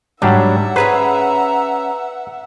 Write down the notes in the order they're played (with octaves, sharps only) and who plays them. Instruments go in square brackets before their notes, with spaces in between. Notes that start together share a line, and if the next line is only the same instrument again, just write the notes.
[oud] G#2 [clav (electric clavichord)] F#3 G3 D4 [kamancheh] E5 F#5
[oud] C#4 G#4 C5 [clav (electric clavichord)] B4 [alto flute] A#5